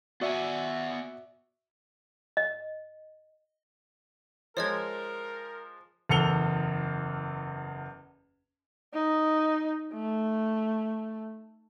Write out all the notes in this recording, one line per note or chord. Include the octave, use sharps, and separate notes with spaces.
B3 F#4 D5 E5 F#5 G#5
D#5
F3 G#3 A#4 C#5 D#5 G#6
F#1 E2 A4 C#7 F7 G7
D#4
A3